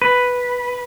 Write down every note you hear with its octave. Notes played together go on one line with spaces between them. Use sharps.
B4